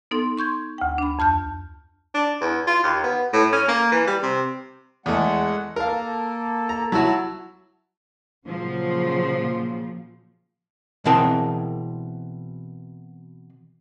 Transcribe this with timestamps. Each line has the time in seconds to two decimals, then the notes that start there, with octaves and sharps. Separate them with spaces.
0.11 B3 D#4 A4 C6
0.37 C6 C#6 G6 G#6
0.78 D2 G5
0.98 D4 B5
1.19 F2 A5 F6 G6
2.14 D4
2.41 E2
2.67 F4
2.83 D#2
3.04 B3
3.33 A2
3.52 C#4
3.68 A#3
3.92 E3
4.07 G3
4.23 C3
5.06 E2 G#3 A3 F#5
5.76 A#3 A4 A#4 F5
6.69 A#5
6.92 F#3 E4 F#4 A5
8.47 A#2 C#3 F3 F#3
11.05 B2 E3 C4 G#4 A#4 A5